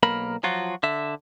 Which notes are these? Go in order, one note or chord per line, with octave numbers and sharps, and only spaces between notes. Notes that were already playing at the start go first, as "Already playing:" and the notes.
B1 A#3 A#4 B5
F3 F#3 F4 F#4
D3 E5